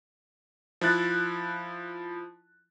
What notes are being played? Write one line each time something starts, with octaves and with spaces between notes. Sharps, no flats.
F3 E4 F#6 A6